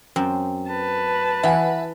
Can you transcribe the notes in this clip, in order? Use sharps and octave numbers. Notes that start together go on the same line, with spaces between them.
F#2 C4
B4 A5
E3 E5 F#5 G#5